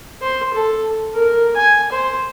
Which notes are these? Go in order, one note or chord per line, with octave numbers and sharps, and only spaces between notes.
C5
A4
A#4
G#5
C5